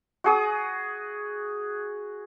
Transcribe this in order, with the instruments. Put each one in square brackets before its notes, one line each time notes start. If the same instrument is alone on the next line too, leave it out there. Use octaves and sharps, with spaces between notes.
[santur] F#4 G#4 D#6